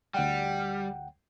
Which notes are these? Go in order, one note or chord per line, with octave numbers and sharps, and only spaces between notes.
D2 G3 F#5 G5